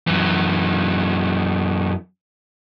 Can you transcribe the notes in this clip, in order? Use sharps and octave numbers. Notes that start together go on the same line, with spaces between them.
F#2 E3